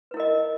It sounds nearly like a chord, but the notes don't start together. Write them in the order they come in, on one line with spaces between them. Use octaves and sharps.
B4 E4 A#4 D#5